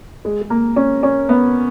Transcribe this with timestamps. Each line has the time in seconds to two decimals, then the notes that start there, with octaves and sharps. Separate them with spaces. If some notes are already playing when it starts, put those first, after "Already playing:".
0.25 G#3
0.41 G#3
0.50 A#3
0.76 C#4
1.03 C#4
1.29 B3